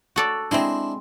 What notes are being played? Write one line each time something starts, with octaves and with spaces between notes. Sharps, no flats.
F#4 A4 D5
G#3 C4 D4 E4